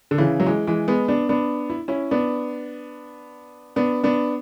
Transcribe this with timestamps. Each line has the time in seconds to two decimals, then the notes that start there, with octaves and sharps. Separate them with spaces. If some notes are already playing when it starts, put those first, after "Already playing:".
0.11 D3
0.18 C#3 E3
0.40 F#3
0.47 E3 G#3
0.67 E3 G#3
0.88 G#3 B3
1.08 B3 D4
1.29 B3 D4
1.70 E4
1.88 C#4 E4
2.11 B3 D4
3.76 B3 D4
4.03 B3 D4